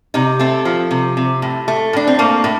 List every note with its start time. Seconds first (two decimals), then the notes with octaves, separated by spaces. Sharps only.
0.14 C3 D#4
0.39 A3 C4
0.65 F3
0.91 C3
1.17 C3
1.42 A2
1.68 A3
1.93 A2 D4
2.07 C4
2.19 A3 A#3
2.44 A2